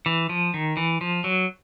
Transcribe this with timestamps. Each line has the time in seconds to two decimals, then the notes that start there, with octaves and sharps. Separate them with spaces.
0.06 E3
0.29 F3
0.54 D#3
0.77 E3
1.01 F3
1.24 F#3